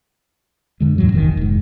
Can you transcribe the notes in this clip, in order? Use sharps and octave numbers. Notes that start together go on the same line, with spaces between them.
F2 D3 G#3
D#2 G#2 E3 F#3
F1 A#1 A2 D#3
F1 G#2